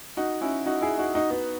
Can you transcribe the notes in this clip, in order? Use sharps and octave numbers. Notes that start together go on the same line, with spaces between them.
D#4 F#4
C#4 E4
D#4 F#4
E4 G#4
D#4 F#4
D#4 F#4
B3 D#4